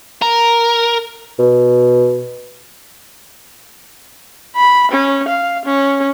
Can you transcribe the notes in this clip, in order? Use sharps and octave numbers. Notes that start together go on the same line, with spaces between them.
A#4
B2
B5
C#4
F5
C#4